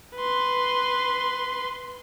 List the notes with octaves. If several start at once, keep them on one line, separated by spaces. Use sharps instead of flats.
B4 C6